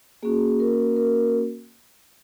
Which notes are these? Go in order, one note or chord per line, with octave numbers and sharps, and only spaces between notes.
A#3 C#4 F#4 G#4
A#4
A#4